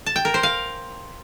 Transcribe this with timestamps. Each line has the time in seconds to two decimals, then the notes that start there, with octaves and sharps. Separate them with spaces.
0.06 A5
0.16 G5
0.25 A#4
0.34 C5
0.43 F5